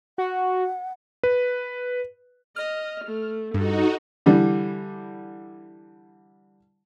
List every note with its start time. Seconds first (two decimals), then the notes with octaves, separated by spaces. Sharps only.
0.18 F#4 F#5
1.23 B4
2.56 D#5 F6
3.05 A3
3.54 G2 D#4 F#4 A4
4.26 D3 E3 G3